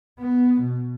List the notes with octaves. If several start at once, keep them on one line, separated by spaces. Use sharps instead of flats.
B3
B2